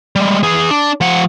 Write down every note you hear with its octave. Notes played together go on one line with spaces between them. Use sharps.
G3 G#3
E3 G#4
D4
F3 F#5